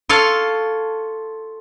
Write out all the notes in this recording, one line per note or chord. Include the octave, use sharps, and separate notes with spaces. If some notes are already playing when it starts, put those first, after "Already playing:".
F4 A4 C#5 F5